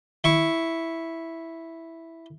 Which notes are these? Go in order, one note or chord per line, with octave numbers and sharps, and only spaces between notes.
E4 C#6